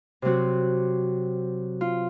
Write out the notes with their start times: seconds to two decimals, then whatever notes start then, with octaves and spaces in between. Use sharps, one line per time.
0.22 C3 F#3 C4 F#4
1.81 F4